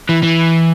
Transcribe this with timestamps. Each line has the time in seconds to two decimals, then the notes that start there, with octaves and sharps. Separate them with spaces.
0.09 E3
0.23 E3